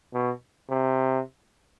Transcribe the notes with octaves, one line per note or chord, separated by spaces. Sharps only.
B2
C3